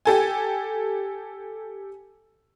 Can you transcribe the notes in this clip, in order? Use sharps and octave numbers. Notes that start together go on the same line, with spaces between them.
G4 A4 G#5